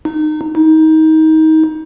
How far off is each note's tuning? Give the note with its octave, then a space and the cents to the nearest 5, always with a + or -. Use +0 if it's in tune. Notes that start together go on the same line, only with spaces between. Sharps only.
D#4 -25
D#4 +25